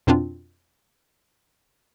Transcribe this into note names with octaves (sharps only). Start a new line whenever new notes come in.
F2 B2 C4 D4 F4